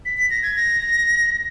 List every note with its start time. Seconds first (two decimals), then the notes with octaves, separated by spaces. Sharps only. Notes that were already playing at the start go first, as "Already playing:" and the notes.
0.05 B6
0.17 B6
0.30 A#6
0.43 G#6
0.56 A#6